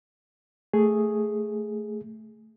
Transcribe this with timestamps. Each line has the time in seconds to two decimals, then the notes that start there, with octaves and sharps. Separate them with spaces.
0.73 A3 G#4